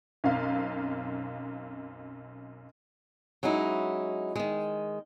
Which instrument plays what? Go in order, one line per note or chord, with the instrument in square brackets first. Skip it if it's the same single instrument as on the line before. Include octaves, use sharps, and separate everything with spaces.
[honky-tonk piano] B1 F#2 C4 F5
[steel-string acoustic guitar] F#3 G#3 C#4 D#4 E4
D#3 G#3